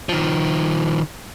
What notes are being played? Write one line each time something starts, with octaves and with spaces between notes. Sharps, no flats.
D#3 F3